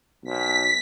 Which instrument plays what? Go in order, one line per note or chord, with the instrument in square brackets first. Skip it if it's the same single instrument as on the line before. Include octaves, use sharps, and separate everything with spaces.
[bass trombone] B1 [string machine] B6